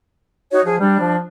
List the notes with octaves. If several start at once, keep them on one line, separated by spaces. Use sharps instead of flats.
D#4 F#4 C#5
F3 G#4
G3 D4
F3